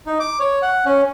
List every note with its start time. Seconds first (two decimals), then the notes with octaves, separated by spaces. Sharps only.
0.06 D#4
0.20 D6
0.40 C#5
0.62 F#5
0.86 C#4